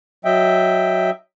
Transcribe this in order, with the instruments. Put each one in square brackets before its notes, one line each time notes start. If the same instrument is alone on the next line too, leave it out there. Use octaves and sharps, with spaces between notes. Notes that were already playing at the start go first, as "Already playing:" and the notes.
[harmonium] F#3 D#5 E5 G5